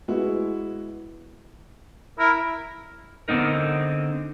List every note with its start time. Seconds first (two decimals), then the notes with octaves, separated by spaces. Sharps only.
0.08 G#3 B3 E4 F#4
2.19 E4 A#4
3.28 D3 B3 C4 D#4 A#4